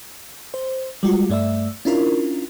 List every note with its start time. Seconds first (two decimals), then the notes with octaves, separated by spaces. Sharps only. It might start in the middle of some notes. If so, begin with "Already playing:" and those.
0.54 C5
1.03 G3 G#3 F4 F#4
1.29 G2 A3 D5 E5 E6
1.85 C#4 D4 E4 F4 A#4